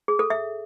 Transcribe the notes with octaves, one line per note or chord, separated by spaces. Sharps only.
G#4
A4
E5